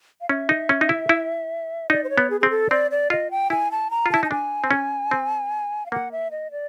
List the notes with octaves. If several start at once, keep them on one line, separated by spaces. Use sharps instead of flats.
F5
C#4 E5
D#4
C#4
D#4
E4
E4
D#4 D5
C5
C#5
B3
G#4
C4 G#4
A4
C4 D5
D5
F4 D#5
G5
E4 G#5
A5
A#5
F4
E4 A5
D#4 A5
D4 G#5
C4
C#4
C4
F5
A#3 F#5
E5
D#5
D5